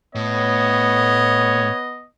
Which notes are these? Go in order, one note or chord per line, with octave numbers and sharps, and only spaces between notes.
A2 B3 C#5 D#5